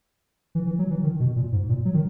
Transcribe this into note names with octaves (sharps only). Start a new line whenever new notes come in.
E3
E3
F#3
E3
D#3
B2
A#2
G#2
A#2
F#3
D#3